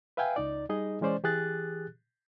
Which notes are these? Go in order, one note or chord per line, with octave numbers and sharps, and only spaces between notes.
B4 E5 F5 G5 G#5
C#2 D#4 D5
G3 D#4 G#4 D#5
E3 G#3 C#4 C5 D5
E3 G4 G#4 F#6 A6